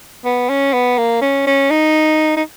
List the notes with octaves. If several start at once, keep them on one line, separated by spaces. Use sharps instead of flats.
B3
C#4
B3
A#3
C#4
C#4
D#4
D#4